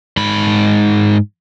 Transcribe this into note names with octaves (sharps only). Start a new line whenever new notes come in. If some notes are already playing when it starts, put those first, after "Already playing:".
G#2 B5